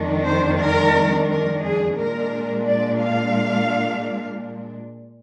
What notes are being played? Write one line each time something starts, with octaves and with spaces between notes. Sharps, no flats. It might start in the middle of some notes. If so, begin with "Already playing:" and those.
Already playing: F2 D#3 G#3 D4
C5
A#4
A#4
G#4
A#2 G#3 D4 A#4
D5
F5